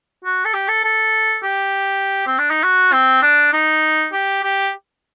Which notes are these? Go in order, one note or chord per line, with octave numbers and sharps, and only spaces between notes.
F#4
A4
G4
A4
A4
G4
C4
D4
D#4
F#4
C4
D4
D#4
G4
G4